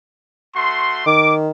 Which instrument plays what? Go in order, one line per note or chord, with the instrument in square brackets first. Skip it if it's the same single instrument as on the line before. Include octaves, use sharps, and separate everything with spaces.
[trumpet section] A3 F#4 C6
[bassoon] D#3 [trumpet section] D6